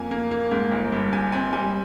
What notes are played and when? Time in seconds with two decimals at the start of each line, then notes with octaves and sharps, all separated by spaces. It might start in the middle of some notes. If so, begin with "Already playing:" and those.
Already playing: F2 A#3 G#5
0.11 A#3
0.31 A#3
0.51 G#2
0.71 G1
0.92 G2
1.12 G2 G#5
1.32 C4 G#5
1.53 G3 G#5